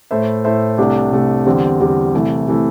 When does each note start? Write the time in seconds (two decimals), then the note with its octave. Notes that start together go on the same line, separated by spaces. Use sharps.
0.11 A2 A3 E4 C5 E5
0.44 A2 A3 E4 C5 E5
0.78 C2 C3 A3 D4 G4
1.12 C2 C3 A3 D4 G4
1.46 E2 D3 G3 C4 G4
1.80 E2 D3 G3 C4 G4
2.14 C2 C3 E3 A3
2.48 C3 E3 A3